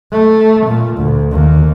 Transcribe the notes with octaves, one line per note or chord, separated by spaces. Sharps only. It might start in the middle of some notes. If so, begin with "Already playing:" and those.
A3
A#2
D2
D#2